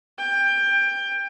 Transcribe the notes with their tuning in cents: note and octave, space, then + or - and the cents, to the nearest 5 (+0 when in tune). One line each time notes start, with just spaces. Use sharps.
G5 +20